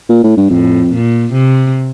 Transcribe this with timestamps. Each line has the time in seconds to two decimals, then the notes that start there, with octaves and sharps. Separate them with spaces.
0.09 A#2
0.24 A2
0.37 G2
0.49 F2 A2
0.92 A#2
1.33 C3